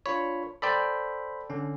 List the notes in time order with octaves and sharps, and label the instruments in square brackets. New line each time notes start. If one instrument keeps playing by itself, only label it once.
[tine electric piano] D4 F4 B5 [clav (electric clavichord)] C#5
[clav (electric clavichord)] A4 D5 G5 [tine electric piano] C5 B5
[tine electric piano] D3 C#4